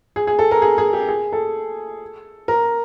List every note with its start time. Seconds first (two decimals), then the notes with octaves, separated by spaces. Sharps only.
0.16 G#4
0.27 G#4
0.39 A4
0.51 A#4
0.62 G#4
0.78 G#4
0.93 G4
1.09 G#4
1.33 A4
2.48 A#4